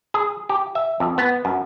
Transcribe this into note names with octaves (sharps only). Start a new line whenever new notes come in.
G#4
G4
E5
F2
B3
F#2